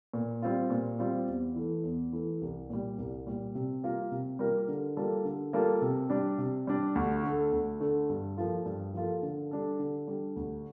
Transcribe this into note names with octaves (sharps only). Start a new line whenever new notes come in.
A#2
G3 C4 F4
A#2
G3 C4 F4
E2
E3 A3
E2
E3 A3
C2
A#2 G3
C2
A#2 G3
C3
G3 A#3 F4 A#4
C3
G3 A#3 F4 A#4
D3
G3 A#3 F4 A4
D3
G3 A#3 F4 A4
C3
G3 D4
C3
G3 D4
D2
D3 A3
D2
D3 A3
G2
F3 A#3 F4 A4
G2
F3 A#3 F4 A4
D3
G3 D4 A4
D3
G3 D4 A4
D2